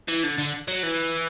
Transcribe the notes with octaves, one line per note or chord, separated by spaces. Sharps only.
E3
D3
D3
F#3
E3